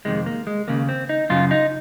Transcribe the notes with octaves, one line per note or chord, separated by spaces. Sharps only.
F2 C3 D#3 G#3
A#3
G#3
D#2 C#3 A#3
C4
D#4
F#2 C#3 F4
D#4